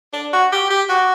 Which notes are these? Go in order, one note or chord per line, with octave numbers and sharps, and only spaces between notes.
D4
F#4
G4
G4
F#4